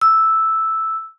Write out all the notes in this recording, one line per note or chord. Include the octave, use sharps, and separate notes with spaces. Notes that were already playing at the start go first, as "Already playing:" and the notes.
E6